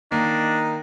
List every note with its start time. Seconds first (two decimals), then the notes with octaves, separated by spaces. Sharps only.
0.12 D#3 A#3 D4 D#4